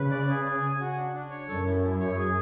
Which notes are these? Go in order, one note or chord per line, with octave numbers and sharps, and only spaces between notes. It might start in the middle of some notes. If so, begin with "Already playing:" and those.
Already playing: C#3 B4
D5
G#4
G#4
G#5
F#4
D4
D4
C#5
F#2 A4
E4
E4
C#5
G#4